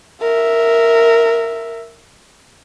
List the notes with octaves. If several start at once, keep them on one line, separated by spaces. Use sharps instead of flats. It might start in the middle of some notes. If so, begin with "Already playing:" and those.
A#4 E5